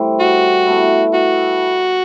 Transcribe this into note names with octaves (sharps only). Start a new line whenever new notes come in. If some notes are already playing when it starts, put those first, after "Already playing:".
Already playing: A2 E3 G3 C4 E4
F#4
B2 A3 E4
F#4